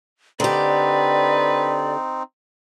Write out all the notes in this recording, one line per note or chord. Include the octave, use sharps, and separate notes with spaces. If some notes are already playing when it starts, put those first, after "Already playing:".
D3 C4 D#4 G4 B4 D5